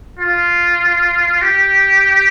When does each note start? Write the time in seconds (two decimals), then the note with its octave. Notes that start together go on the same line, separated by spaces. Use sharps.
0.19 F4
1.42 G4